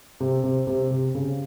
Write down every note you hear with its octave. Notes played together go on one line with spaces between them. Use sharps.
C3
C3
C3
C3
C#3